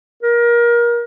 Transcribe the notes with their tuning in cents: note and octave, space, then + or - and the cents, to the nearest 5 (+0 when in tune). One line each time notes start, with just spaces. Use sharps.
A#4 +25